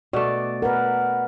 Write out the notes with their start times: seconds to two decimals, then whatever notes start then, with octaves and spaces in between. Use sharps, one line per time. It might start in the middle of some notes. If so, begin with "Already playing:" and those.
0.13 B2 A3 D5
0.62 A#4 B4 F#5